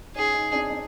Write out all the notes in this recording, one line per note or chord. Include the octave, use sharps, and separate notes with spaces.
C#4 D#4 G#4
C#4 D#4
C4 D4
C4 D4